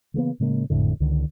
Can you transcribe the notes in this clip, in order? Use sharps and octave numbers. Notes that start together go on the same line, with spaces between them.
C#3 E3 A#3 B3
A2 C#3 G#3 A#3
G#1 F2 A2 D3
C#2 D3 D#3